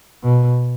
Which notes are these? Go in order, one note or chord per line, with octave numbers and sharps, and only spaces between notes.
B2